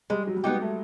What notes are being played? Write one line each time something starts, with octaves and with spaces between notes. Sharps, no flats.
G3 G#3
F#3
G3
G#3 B3 D#4 G4
A3